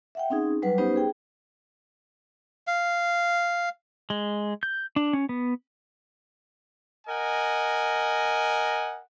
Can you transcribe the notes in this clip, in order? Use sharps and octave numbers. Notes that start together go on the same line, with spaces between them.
E5 F#5 G5
C4 C#4 D#4 G#4
F#3 G3 B4 F#5
B3 C#4 D#4 G4 B4 C5
G#4 G5
F5
G#3
G6
D4
C#4
B3
A#4 D#5 F#5 G#5